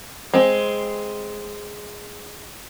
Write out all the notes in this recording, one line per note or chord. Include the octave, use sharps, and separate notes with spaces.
G#3 C4